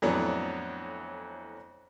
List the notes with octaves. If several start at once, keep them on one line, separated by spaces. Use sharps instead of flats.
F2 A2 E3 F#3 B3 D4